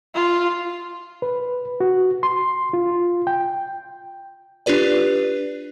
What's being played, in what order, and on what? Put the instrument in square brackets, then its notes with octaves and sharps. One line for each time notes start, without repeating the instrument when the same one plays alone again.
[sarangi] F4
[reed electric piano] B4
F#4
C6
F4
G5
[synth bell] D4 F4 G4 B4 D5